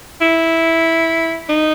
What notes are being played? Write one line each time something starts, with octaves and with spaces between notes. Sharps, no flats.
E4
D#4